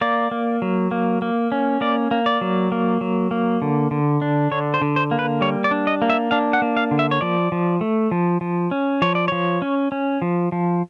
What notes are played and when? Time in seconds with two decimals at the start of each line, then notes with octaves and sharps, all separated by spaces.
0.01 A#3 D5
0.31 A#3
0.62 F#3
0.91 A#3
1.22 A#3
1.52 C#4
1.81 A#3 D5
2.11 A#3
2.26 D5
2.41 F#3
2.72 A#3
3.01 F#3
3.31 A#3
3.62 D3
3.91 D3
4.22 D4
4.51 D3 C#5
4.74 C5
4.82 D3
4.96 C5
5.11 A#3
5.19 B4
5.41 G3 C#5
5.64 D5
5.71 D4
5.87 D#5
6.02 A#3
6.10 E5
6.31 D4 F5
6.53 F#5
6.62 A#3
6.77 F5
6.91 D3
6.99 E5
7.11 C#5
7.21 F3 D5
7.52 F3
7.81 A3
8.11 F3
8.41 F3
8.71 C#4
9.02 F3 C#5
9.15 D5
9.28 F3 C#5
9.62 C#4
9.92 C#4
10.22 F3
10.52 F3